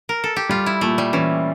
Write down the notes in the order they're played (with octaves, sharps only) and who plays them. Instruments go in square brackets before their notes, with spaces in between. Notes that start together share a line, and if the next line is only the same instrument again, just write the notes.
[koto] A#4
A4
G4
[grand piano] G3 [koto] F4
[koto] E4
[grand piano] A#2 [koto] A3
[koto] G3
[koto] E3 [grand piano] C#4